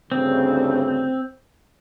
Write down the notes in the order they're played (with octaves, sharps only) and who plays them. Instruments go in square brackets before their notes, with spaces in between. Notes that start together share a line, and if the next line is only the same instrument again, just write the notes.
[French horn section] D2 G2 C#3 [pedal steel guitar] C4